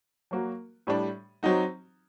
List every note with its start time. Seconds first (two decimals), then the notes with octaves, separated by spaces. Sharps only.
0.31 F#3 A#3 F#4
0.87 A2 G3 D4
1.43 F#3 C4 D#4 F#4